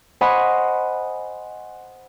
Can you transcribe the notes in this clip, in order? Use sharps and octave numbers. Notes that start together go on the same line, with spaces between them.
C5 D#5 F#5 G#5 B5 C#6